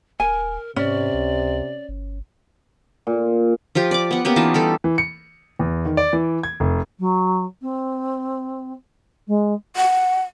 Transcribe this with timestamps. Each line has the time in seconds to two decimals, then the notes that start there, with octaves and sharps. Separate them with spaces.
0.20 D#1 A#4 G#5
0.76 G#2 C3 C#4 D5
1.14 C#2
1.89 G1
3.07 A#2
3.75 F3 F4 G4
3.91 D5 D6
4.11 B3 F#5
4.25 A#3 B3 C#4 G4
4.36 E3 D#4 F4 A5
4.54 G3 G4 A4
4.84 E3
4.98 C#7
5.59 E2
5.85 D#3
5.97 D5
6.13 E3
6.43 G#6
6.60 F1
6.99 F#3
7.61 C4
9.27 G#3
9.76 F#5